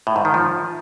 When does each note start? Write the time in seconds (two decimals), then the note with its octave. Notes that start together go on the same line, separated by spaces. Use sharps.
0.07 A2
0.16 G#2
0.25 D#3
0.34 F3